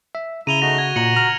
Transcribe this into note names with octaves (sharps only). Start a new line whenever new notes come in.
E5
C#3 E4 A#5 D#7 F7 G7
A3 D#4 F#4 A#6
F#4 G#6
A#2 A#5 C#7 F#7
A#5 F6